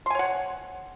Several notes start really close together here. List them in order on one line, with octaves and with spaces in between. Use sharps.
C6 G#5 C#5 F#5